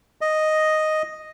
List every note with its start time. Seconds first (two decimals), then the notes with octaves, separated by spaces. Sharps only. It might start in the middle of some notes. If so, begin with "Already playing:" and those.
0.21 D#5